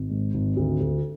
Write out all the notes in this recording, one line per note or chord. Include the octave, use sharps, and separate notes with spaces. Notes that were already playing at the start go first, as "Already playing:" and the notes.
Already playing: G#1
G#2
G#1
D2
D2